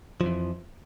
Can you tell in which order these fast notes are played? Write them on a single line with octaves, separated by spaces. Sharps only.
F3 F2 E3